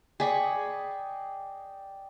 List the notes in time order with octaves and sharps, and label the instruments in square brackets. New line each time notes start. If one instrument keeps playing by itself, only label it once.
[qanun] G#4 B5 C#6 [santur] D5 D#5 G5